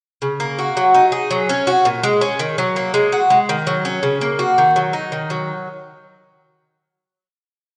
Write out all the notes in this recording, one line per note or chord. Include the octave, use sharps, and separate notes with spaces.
C#3
A#3
F#4
F#3
D#4
G#4
F#3
C#4
F#4
A#2
G#3
C#4
D#3
F#3
A#3
G#3
F#4
G#3
D#3
F#3
C#4
C#3
A#3
F#4
D#3
F#3
D#4
D#3
F#3